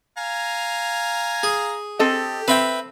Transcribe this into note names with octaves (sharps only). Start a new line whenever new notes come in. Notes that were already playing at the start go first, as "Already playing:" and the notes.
F5 G#5 A#5
G#4
C4 G4 A4 D#5
C4 B4 E5 G5